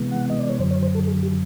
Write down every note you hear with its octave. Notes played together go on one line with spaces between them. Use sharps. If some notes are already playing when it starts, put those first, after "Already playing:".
Already playing: C3 E3 G#3 B3
F#5
D#5
D5
C#5
F#2 D3 F#3 C5
C#5
C5
A4
G#4
G4